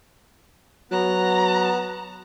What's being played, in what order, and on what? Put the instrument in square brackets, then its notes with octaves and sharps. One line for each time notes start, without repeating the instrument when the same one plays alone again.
[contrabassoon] F#3 [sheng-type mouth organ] B3 F#6 [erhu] A#5